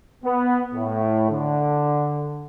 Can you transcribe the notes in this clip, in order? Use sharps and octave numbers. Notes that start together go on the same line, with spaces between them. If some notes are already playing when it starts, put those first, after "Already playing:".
B3
A2
D3